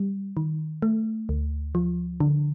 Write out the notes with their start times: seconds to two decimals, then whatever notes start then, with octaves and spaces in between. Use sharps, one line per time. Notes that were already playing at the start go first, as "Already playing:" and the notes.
Already playing: G3
0.37 D#3
0.82 A3
1.29 D2
1.75 F3
2.20 D3